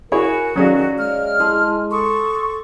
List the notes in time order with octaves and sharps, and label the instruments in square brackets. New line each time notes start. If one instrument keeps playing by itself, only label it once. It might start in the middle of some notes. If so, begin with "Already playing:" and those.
[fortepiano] E4 G#4 C#5 [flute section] F#4 [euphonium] A#4 [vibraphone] G#5
[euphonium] D#3 [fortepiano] F#3 C#4 G#4 [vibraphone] C#5 D5 F5
[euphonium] G#3 [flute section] F6
[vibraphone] E4 A5 C6 [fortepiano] G#4
[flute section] A4 C#6 [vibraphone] C6 D#6